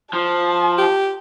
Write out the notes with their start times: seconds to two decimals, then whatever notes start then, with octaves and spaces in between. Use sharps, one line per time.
0.13 F3 A5
0.78 G4